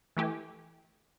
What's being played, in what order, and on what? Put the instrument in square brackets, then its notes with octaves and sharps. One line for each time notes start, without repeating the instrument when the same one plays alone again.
[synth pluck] E3 A3 G4 G#5